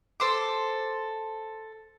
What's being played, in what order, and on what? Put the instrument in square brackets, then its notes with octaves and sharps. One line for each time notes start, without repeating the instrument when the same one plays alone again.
[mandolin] A4 C5 D6